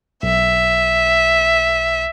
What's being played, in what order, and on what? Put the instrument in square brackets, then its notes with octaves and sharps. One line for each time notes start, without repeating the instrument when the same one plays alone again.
[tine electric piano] B1 [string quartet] E5